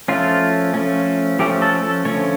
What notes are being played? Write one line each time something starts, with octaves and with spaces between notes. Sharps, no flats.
F3 A3 C#4 F4
F3 A3 C#4
F3 A3 C#4 G4
A4
A4
D3 F3 A3 C#4 C#5